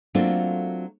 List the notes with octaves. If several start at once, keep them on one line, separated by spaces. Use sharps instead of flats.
F#3 A3 A#3 C4 D4 F4